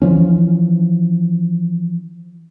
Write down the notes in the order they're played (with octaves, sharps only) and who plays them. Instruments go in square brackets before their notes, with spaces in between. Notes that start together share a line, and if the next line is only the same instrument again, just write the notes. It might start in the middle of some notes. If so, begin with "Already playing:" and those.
[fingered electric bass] E3 F3 C#4